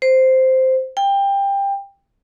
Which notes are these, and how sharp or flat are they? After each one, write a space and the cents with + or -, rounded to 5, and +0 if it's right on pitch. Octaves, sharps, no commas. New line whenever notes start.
C5 -5
G5 +20